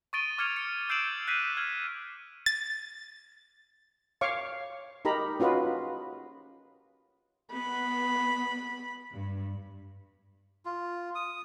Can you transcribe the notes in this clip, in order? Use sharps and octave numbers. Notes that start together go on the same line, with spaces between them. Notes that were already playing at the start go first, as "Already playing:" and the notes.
C#6 D#6 A6 D7 D#7 G7
D6 F6 G#6 C#7 D#7 F7
C#7
E6 G6 C7 D7 E7 F#7
F#6 G6 B6 C7 D#7
F6 G#6 F#7
A6
C#5 F5 C#6 D6
D#4 G4 A#4 A#5 B5
C#4 F4 F#4 B4 D#5
B3 B5
G2
F4
D#6